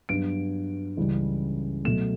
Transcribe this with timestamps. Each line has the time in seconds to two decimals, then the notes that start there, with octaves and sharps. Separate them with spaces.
0.09 G2 F#3 B3 D7
0.97 C#2 C#3 E3 G3
1.85 B2 F#3 A3 E7